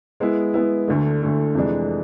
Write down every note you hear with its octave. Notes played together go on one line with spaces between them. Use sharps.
G#3 B3 E4
G#3 B3 E4
D2 D3 A3
D2 D3 A3
F2 C3 E3 G#3 D4